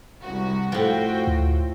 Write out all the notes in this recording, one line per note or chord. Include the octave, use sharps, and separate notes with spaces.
C2 F#4
A2 F3 F#4 C5 G5
D2